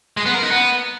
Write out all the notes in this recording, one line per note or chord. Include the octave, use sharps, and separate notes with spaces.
G#3
B3
A#4
D#4
B3